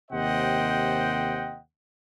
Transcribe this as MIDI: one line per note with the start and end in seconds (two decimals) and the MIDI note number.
0.11 1.59 39
0.11 1.59 48
0.11 1.59 72
0.11 1.59 75
0.11 1.59 78
0.11 1.59 79